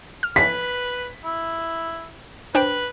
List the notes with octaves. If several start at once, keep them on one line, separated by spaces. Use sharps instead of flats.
F6
B4 B6
E4
D4 B4 C5 G5